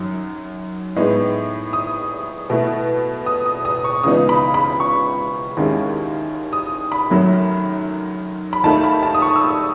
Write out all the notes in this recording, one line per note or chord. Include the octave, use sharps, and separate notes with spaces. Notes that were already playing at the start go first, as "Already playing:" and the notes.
Already playing: F#2 D#3 F#3
A2 G#3 B3 D#4
D#6
B2 A3 E4
D#6
D#6
D#6
C#6
C#2 C#3 E3 B3 D#4 D#6
B5
B5
C#6
D#2 D#3 G#3 C#4 E4
D#6
B5
F#2 D#3 F#3 A3
B5
D#2 D#3 A3 D#4 A5
B5
A5
D#6
C#6
E6
D#6